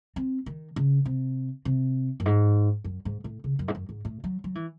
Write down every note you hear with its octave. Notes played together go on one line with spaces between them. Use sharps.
C4
D#3
C#3
C3
C3
F#2
G#2
F#2
G#2
A2
C#3
F#2
G#2
F#2
G#2
A2
F#3
F#3
E3